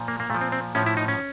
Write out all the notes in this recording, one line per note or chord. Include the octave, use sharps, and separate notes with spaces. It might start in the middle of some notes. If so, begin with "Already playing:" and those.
Already playing: A#2 F3
A#3
A#3
A#2 F3 A3
C4
C4
A2 F3 C#4
E4
D#4
C#4